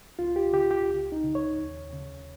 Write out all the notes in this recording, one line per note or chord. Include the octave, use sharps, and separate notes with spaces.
C#2 F4
G4
C#3 G4
G4
C#2
D#4
C#3
C#5
D#2
C#3